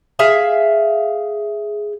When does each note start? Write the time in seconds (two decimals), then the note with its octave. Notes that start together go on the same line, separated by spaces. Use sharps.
0.19 G#4 E5 F5